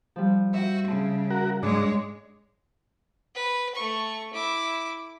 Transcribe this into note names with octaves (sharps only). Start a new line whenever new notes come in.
F3 G3
F#4 E5 G5
C#3 A5
F#4 A#4
G#2 G#3 D4 C#5
B4
A3 C#6
E4 D6